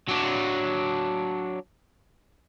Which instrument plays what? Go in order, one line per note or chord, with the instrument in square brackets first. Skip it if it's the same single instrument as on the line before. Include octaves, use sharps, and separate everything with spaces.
[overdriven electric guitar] F#3 D4